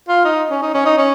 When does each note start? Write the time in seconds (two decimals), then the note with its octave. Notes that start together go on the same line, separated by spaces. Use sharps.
0.08 F4
0.25 D#4
0.50 C#4
0.62 D#4
0.74 C#4
0.86 D#4
0.98 C#4